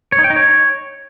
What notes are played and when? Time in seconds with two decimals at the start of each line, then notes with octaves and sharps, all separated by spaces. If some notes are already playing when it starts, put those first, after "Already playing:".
0.12 C#5
0.18 D#4
0.24 G5
0.30 D#4
0.36 C#5